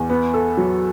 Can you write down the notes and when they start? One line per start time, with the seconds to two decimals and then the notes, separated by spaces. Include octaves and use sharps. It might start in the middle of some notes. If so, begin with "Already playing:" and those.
Already playing: E2
0.10 B3
0.34 A4
0.57 F#3